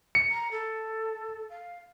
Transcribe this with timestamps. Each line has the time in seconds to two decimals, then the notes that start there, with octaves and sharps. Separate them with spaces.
0.15 C#7
0.31 A#5
0.52 A4
1.50 F5